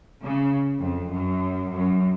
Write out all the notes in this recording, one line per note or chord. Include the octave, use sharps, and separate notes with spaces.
C#3
F2
F#2
F#2